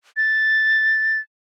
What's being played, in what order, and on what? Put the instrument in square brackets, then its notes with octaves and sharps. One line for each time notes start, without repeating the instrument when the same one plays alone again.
[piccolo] A6